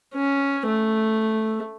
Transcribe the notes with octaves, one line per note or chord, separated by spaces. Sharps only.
C#4
A3